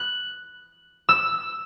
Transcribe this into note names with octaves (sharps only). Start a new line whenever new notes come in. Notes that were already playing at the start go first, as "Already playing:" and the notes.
Already playing: F#6
E6